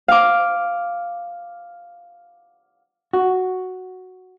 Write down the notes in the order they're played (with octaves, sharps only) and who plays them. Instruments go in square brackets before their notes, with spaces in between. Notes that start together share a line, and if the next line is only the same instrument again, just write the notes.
[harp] F5 D6
[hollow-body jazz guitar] F#4